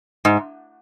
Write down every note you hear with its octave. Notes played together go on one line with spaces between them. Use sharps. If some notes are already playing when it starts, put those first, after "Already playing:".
G#2